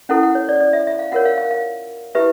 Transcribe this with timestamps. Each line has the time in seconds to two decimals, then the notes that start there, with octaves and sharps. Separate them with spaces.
0.09 C#4 E4 A4 F#5
0.23 F#5
0.35 C#5
0.49 D5
0.60 D5
0.73 E5
0.87 E5
0.99 F5
1.12 F4 A#4 C#5 F#5
1.25 F5
1.38 F5
1.51 F5
2.15 E4 G4 B4 E5